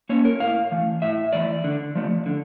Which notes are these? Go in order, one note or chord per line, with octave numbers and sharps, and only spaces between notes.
A#3 C#4 C#5
A#4
A2 F5
E3 A3
A2 E5
E3 A3 D5
D3
F3 A3
D3